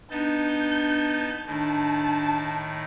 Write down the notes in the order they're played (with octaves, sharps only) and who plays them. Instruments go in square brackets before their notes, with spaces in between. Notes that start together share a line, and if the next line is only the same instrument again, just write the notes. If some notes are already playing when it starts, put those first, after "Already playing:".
[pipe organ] B3 D#4 A5 [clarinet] D4 [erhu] G6
[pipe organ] A2 D#3 [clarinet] D4 [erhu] A5